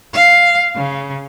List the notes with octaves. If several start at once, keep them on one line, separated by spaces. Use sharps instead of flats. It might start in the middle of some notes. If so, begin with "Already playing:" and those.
F5
C#3